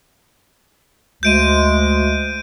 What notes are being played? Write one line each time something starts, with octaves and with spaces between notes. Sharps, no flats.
D2 G#3 G6 D7 D#7